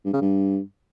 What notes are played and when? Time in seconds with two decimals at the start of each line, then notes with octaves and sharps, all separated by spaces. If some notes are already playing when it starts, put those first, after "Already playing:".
0.05 G2
0.13 C#3
0.22 G2